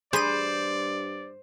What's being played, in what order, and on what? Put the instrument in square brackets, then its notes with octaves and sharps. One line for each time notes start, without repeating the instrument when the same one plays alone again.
[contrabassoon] G2 [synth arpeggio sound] G#4 B5 D#7 [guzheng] C5 [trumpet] D5